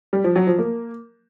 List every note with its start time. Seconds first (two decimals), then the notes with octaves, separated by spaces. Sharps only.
0.13 G3
0.24 F3
0.36 F#3
0.47 F3
0.59 A#3